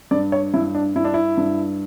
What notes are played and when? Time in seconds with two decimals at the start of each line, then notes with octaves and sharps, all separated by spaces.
0.11 G2 D5
0.32 C#5
0.54 G2 E4
0.75 D4
0.96 G2 E4
1.05 D4
1.14 E4
1.37 G2